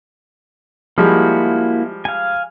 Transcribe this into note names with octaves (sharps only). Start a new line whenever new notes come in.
F3 G3 G#3 A#3 E4 F#4
F5 G#5